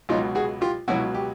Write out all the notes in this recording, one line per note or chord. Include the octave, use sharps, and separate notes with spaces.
C#2 B2 F#3 D#4 F4
F#4 G#4
F4 G4
C#2 B2 F#3 E4 F#4
G4